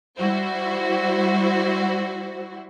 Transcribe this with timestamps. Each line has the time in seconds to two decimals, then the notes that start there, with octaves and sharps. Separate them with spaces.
0.19 G3 E4 F#4 C5